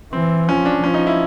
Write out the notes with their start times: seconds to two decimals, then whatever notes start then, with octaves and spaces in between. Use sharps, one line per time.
0.13 E3 C4
0.47 F3 C#4
0.65 D4
0.83 F3 C#4
0.94 D#4
1.07 E4